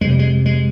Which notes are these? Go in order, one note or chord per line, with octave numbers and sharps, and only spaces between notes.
F2 C3 G#3
G3
G#3
G#3